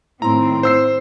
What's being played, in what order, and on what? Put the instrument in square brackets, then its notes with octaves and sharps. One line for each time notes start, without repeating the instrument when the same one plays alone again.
[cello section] A2 D#3 C4 [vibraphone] E4 C6 [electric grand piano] A#5
[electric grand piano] C5 E6 C7